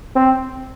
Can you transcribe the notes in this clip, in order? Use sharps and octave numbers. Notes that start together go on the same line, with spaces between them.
C4